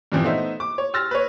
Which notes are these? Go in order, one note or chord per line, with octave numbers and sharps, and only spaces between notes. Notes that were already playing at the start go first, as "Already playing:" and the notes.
G2 A#2 E3 F3 C4
A3 B3 D#4 C5 E5
D6
C#5
C6 E6 F6 A6 A#6
B4 C#5